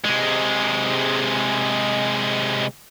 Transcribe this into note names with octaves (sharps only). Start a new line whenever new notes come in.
C3 G#3